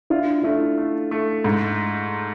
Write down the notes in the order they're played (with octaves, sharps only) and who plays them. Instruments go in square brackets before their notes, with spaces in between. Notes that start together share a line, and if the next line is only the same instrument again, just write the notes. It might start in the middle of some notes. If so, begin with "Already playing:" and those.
[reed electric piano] D4 E4 [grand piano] F4
[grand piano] A3 [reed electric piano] D4 E4
[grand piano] A3
A3
G#2